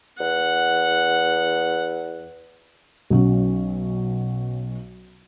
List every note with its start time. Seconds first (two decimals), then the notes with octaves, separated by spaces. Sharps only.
0.20 E2 F#5
3.10 B1 F#3 C#4